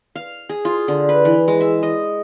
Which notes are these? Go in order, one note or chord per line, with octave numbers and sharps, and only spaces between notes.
F5
G#4
F4
D3
B4
E3
G#3
E5
D#5